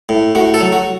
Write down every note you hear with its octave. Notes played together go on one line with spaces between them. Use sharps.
A2
A2 F#4
A4
F#3
F#4